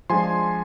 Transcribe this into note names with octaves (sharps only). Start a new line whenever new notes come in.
F3 G#3 D4 G#5 C6